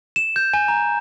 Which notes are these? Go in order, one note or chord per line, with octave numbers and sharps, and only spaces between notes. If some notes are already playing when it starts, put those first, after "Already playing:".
E7
G6
G#5
A#5